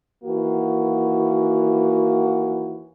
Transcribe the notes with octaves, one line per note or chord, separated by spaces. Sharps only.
D#2 E3 A#3 F#4